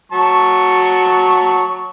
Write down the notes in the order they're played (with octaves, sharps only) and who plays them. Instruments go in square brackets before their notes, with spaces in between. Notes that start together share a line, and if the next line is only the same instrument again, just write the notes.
[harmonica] F#3 A5 C#6